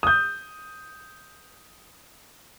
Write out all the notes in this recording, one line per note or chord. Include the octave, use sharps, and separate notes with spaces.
D#6 G6